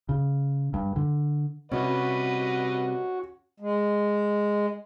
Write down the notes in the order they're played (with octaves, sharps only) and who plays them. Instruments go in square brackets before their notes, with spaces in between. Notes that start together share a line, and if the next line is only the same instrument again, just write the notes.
[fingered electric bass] C#3
G2
D3
[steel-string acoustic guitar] C3 G3 [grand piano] C#4 [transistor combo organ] F#4 [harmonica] B4 D#5 F#5
[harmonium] G#3